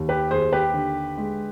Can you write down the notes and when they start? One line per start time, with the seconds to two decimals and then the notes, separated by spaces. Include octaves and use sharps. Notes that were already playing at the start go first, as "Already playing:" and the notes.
Already playing: D#2
0.09 G4 B4
0.31 D#2 G#4 C5
0.52 G4 B4
0.74 D3
1.18 G#3